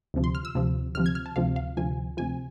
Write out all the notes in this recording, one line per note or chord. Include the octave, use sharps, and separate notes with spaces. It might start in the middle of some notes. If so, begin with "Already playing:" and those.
D2 C3 F3
C6
F6
E6
D2 C3 F3
D2 C3 F3 F6
G#6
F6
A5
D2 C3 F3 F5
F5
D2 C3 F3 G#5
D2 C3 F3 G#5